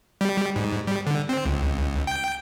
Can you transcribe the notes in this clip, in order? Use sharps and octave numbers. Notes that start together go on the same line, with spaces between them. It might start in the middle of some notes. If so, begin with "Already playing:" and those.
G3
G#2
G3
D3
C4
C#2
G5